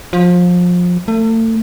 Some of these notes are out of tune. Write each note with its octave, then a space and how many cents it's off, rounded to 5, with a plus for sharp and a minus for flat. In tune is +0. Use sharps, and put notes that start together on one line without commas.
F3 +25
A3 +35